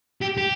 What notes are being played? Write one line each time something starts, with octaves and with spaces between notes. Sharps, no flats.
G4
G4